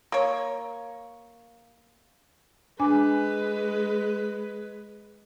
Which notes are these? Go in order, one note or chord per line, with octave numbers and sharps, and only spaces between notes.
A#3 C#5
G#3 D4 B4 G#5 D6